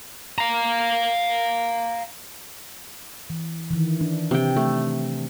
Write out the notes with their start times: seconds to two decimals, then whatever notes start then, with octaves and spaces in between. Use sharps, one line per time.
0.38 F5 A#5
3.30 E3
3.70 D#3 E3
4.01 D4
4.31 C3 G5
4.56 A3